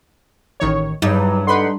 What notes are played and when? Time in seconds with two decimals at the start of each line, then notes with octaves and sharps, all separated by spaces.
0.60 A1 D#3 C#5
1.02 E2 G2 F#3 D#4
1.47 D3 D#4 B4 F#5 B5 C6